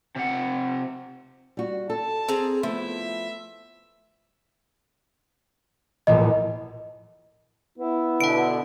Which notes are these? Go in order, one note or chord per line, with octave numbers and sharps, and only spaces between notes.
C3 F#5
G3 F#4
A4 A5
C4 G#4 A#5
F3 A3 B3 E4 E5
E1 A#1 A2 D#5
B3 E4
B2 D3 F#5 D7